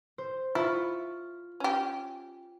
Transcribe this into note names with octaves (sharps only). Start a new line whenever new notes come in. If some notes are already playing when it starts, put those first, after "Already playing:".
C5
E4 F4 C#6
C#4 G4